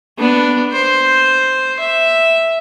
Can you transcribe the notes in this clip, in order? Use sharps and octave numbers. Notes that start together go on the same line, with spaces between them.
B3 D4
C5
E5